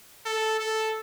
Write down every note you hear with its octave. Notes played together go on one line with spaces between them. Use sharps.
A4
A4